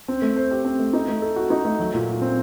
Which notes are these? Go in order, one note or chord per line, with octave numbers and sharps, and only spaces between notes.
C4
A3
C5
G4
C4
A3
D#4
A3
A4
F#4
D#4
A3
F#3
A#2
F#4
C4